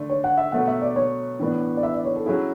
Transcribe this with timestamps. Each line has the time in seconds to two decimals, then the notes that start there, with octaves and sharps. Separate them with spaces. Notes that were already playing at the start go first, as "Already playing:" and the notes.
Already playing: D3 A3 D4
0.10 C#5
0.24 F#5
0.37 E5
0.52 B2 F#3 A3 F#5
0.68 E5
0.82 D5
0.96 C#5
1.39 A2 E3 B3 D4
1.77 D5
1.83 E5
1.94 D5
2.05 C#5
2.16 A4
2.26 F#3 C#4 E4 G#4